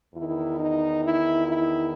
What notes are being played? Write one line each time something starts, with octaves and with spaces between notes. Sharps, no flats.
E2 D#3 E4
D#4
E4
E4